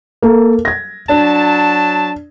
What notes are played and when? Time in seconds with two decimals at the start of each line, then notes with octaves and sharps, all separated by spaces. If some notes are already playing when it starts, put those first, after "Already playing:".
0.22 A#3 A4
0.65 G#6 A#6
1.09 F#3 D4 A5